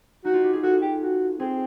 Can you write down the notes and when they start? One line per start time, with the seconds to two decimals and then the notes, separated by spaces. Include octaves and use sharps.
0.25 D#4 F#4
0.33 F4
0.44 G4
0.53 G#4
0.63 F#4 A4
0.82 G4
1.02 F#4
1.40 C4 G#4